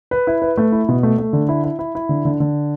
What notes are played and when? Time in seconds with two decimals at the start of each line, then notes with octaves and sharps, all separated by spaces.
0.11 B4
0.27 E4
0.42 B4
0.58 A3
0.72 E4
0.89 B2
1.03 A3
1.18 A3
1.33 D3
1.49 E4
1.64 E4
1.79 E4
1.95 E4
2.09 D3
2.25 D3
2.40 D3